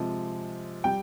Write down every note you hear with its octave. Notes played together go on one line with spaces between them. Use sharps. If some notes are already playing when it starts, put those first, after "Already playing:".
Already playing: C3 F3 G#3
G3 G5